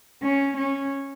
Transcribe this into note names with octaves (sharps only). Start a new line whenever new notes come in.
C#4
C#4